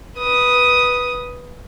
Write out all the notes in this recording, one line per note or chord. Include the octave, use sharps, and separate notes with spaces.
B4 D#6